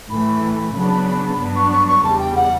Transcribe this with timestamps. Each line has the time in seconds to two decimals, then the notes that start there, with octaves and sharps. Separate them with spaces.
0.09 A2 E3 A3 B5
0.74 C#3 F#3 B3 D4
1.38 G2 F#3 B3 D4
1.55 C#6
1.71 C#6
1.87 C#6
2.03 E2 C#3 G3 A5
2.19 G5
2.35 F#5